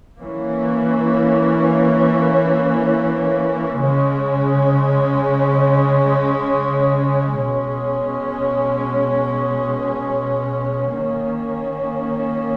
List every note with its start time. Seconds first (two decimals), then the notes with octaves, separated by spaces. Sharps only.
0.21 E3 A#3 C#4
3.79 C#3 G#3 C#4
7.37 B2 G#3 C#4
10.95 D#3 A#3 C#4